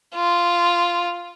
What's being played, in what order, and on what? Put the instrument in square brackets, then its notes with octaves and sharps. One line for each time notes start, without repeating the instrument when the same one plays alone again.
[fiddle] F4